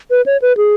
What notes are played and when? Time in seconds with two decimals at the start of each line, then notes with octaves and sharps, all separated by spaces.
0.10 B4
0.26 C#5
0.42 B4
0.57 G#4